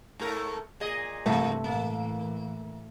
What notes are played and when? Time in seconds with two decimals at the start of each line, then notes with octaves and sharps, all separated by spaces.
0.19 G#2 A3 A#4
0.80 A#2 G#4 D#5
1.26 G2 C3 E3 A3 A#3
1.64 A2 E3 A#3